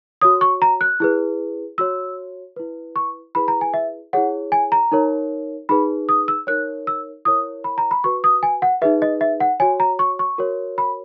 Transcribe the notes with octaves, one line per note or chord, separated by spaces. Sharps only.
F#4 C#5 D#6
C#6
A#5
F#6
E4 G#4 B4
F#4 C#5 E6
E4 B4
C#6
E4 G#4 B4 B5
A#5
G#5
E5
E4 G#4 C#5 F#5
G#5
A#5
D#4 A#4 C#5
D#4 G#4 B4 B5
D#6
E6
D#4 A#4 C#5 F#6
E6
E4 A#4 C#5 D#6
B5
A#5
B5
F#4 B4 C#6
D#6
G#5
F#5
D#4 G#4 B4 E5
D#5
E5
F#5
F#4 C#5 G#5
A#5
C#6
C#6
F#4 A#4 C#5
B5